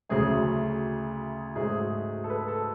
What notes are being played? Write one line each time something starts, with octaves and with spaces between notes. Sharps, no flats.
D2 C#3 F#3 A3 G#4
G#2 F#3 A3 G#4
A4
B4
A4